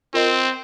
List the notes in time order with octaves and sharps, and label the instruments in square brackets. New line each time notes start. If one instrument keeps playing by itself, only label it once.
[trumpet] C4 [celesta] F4 A#4 D#5 C6